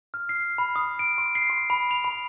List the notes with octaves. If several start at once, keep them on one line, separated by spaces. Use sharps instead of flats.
F6
C7
B5
D#6
D7
C6
C7
C6
B5
F7
B5